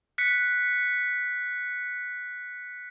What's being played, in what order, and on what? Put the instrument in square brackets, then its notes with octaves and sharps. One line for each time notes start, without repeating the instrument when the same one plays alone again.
[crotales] F#6 B6 C#7